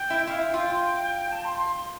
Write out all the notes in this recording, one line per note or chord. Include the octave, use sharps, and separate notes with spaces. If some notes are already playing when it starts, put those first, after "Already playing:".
Already playing: G5
E4
E4 F5
F4 G5
A5
C6
C6